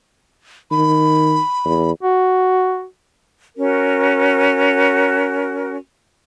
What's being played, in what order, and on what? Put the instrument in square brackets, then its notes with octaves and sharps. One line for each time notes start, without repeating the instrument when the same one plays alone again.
[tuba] D#3 [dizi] B5
[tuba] E2
[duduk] F#4
[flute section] C#4 F#4 A#4